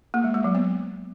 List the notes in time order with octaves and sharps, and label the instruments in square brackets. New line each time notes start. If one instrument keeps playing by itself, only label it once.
[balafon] A#3
G#3
G#3
F#3
B3